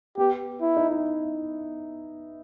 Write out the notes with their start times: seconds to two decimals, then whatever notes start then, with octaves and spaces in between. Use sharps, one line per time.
0.17 B3 G4
0.61 E4
0.77 D#4
0.91 E4